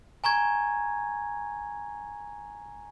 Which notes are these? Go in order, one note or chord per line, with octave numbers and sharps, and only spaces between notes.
G#5 A#5 C#6 G#6